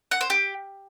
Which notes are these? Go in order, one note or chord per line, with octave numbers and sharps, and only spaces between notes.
F#5
C5
G4